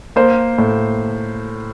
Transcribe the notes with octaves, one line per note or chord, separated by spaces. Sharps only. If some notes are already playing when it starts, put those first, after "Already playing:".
A#3 C5
A2